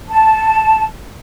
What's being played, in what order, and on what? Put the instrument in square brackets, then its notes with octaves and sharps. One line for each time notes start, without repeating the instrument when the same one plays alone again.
[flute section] A5